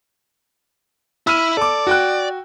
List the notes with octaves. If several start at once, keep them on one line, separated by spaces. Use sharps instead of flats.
E4 E6 F6 D#7
A4 D5 D6
F#4 G5 F#6